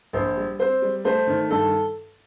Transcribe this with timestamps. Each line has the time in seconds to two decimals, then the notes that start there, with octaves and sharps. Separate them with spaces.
0.13 A#1 C5
0.37 G3
0.59 C4 C5
0.82 G3
1.05 A3 C5
1.27 D#3
1.49 G2 A4